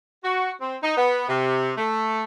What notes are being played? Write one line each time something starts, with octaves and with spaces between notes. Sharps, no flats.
F#4
C4
D#4
B3
C3
A3